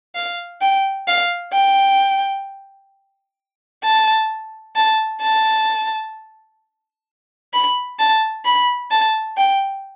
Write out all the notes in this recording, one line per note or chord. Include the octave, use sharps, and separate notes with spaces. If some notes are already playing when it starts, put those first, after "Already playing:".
F5
G5
F5
G5
A5
A5
A5
B5
A5
B5
A5
G5